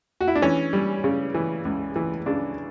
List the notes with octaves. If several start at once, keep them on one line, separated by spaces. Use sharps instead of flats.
F#4
E4
D4
E3 C#4
G3
C#3
E3
C#2
E3
C#3 D4